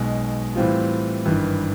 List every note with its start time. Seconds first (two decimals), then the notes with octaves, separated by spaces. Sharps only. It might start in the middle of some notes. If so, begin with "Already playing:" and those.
Already playing: B1 B2 G#3
0.56 A2 E3 G3 C4 F4
1.26 G#1 G2 E3